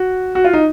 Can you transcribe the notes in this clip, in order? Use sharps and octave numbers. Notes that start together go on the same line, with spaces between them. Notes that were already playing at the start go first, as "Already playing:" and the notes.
Already playing: F#4
F#4
F4
D#4